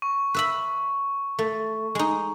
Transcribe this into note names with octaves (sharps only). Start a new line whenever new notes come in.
C#6
B4 E5 B5
A3
G#3 D#4